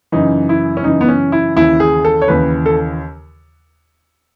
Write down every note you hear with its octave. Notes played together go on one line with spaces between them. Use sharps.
F#2 C#3 E3 D#4
E4
C#4
F#2 C#3 E3 D#4
B3
C#4
E4
D#2 C#3 E3 E4
G#4
A4
C#5
D#2 C#3 E3 B4
A4